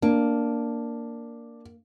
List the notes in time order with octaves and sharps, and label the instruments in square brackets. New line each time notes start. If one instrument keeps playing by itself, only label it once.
[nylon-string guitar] A#3 [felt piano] D4